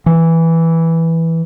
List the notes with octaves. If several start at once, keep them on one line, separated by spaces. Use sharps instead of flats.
E3